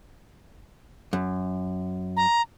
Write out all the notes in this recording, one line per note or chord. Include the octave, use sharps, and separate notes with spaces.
F#2
A#5